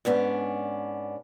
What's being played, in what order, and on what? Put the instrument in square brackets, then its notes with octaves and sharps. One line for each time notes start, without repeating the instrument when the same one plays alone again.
[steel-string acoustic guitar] G#2 B3 C#4 D4